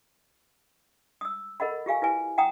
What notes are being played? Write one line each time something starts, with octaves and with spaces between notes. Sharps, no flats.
D#6 E6
A4 A#4 D#5 F#5 B5
F4 G4 F5 G#5
E4 B4 G#5
F#5 G5 A#5 D#6